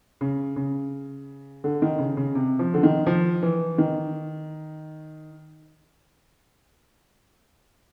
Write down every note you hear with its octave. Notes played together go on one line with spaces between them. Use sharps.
C#3
C#3
D3
D#3
C#3
C#3
C3
F3
D3
D#3
F3
E3
D#3